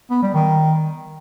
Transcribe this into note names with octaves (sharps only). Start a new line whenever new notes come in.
B3
G3
D#3